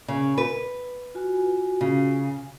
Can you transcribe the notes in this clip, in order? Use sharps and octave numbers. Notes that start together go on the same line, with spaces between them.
C#3
B4
F4 F#4 G#5
C#3